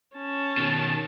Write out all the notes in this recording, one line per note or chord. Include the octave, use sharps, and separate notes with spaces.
C#4 A5
B2 D#3